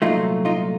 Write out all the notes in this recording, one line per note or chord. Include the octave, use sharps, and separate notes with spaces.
C2 A#2 F#3 A3 D#4 F4
D#4 F4